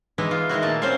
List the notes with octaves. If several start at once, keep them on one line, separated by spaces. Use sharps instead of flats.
E3 G#3 B3 D#4 E4
F4
D#3 G#3 E4 F#4
A#2 A3 A#3 A5
G3 C4 C#4 C5 C#5 F5